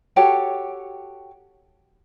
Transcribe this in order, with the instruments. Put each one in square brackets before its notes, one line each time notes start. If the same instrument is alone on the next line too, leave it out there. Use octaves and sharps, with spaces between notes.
[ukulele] F#4 G4 A4 C#5